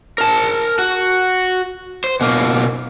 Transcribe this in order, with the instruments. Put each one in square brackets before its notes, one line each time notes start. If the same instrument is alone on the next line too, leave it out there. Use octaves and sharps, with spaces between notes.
[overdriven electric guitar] A#4 A5
F#4
C5
B2 A#3